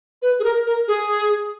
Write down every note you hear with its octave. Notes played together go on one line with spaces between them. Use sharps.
B4
G#4
A#4
A#4
G#4